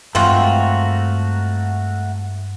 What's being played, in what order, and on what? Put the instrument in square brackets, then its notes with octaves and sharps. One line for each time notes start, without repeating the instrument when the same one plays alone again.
[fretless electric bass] G2 G#3 [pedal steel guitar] A3 F#4 A#4 [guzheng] C4 F4